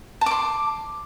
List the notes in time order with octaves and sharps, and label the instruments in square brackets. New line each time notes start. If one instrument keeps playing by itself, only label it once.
[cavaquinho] A5
D6
C6